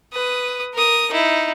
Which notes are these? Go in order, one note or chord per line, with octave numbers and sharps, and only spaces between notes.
B4 D#6
A#4 D#6
D#4 E4